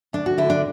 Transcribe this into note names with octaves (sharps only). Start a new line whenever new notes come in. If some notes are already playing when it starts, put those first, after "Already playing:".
D2 D4
F#4
D3 E4
D4